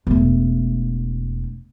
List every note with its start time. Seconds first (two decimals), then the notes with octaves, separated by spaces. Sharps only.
0.07 E1 A3